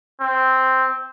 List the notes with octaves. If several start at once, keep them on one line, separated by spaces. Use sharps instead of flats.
C4